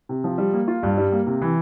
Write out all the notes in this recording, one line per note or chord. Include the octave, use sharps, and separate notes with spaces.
C3
F3
G3
A#3
F4
G2
G3
A#3
C3
E3